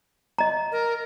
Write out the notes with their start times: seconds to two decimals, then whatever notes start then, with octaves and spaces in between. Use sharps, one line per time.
0.38 D#5 A#5
0.72 A#4